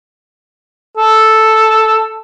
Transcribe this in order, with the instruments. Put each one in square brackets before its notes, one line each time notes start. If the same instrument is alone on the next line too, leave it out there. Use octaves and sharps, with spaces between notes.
[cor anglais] A4